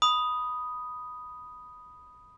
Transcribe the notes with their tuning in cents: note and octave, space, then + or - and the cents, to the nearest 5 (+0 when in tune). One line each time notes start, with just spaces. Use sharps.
B5 +0 D#6 +0